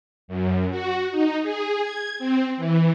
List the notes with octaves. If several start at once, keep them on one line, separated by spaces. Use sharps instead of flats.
F#2
F#4
D#4
G#4
G#6
C4
E3